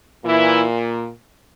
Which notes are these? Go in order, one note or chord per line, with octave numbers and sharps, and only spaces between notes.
A#2 E3 E4